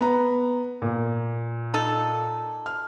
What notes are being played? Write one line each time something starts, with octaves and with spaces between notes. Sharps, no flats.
B3 A#5
A#2
D#4 A4
F6